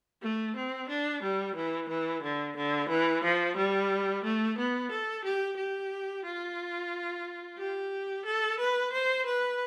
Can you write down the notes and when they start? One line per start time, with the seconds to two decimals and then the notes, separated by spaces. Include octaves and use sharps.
0.22 A3
0.56 C4
0.89 D4
1.23 G3
1.55 E3
1.89 E3
2.23 D3
2.57 D3
2.89 E3
3.24 F3
3.57 G3
4.24 A3
4.58 B3
4.91 A4
5.25 G4
5.57 G4
6.25 F4
7.58 G4
8.25 A4
8.59 B4
8.93 C5
9.26 B4